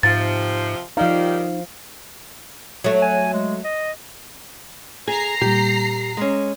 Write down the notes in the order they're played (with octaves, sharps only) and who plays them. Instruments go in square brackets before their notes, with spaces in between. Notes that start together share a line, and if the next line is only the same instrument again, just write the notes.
[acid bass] G#2 [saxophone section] C3 F3 [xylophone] A6
[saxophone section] D#3 G3 [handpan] F3 F5 [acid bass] D#4
[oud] F#3 A3
[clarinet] G#5
G#3
D#5
[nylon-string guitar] G#4 [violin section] A#5 C7
[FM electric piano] A#2 G3 [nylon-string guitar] G4
[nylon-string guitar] G#3 C#4